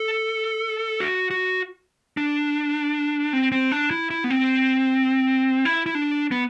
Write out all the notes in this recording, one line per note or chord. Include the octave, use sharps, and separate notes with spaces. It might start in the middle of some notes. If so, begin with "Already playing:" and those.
Already playing: A4
F#4
F#4
D4
C4
C4
D4
E4
E4
B3
C4
E4
E4
D4
B3